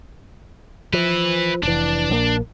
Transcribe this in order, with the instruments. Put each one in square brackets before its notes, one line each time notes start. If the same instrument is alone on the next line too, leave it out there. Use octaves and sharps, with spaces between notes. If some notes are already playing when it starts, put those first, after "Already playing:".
[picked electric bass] F3 [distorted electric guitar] B4 E5
[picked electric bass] F1 E3 [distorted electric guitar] D4
[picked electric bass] A#1 E3 A#3